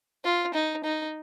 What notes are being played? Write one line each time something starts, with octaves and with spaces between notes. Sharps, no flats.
F4
D#4
D#4